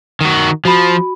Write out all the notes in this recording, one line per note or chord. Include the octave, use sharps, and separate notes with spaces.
D#3 F#4
F3 F#4 B5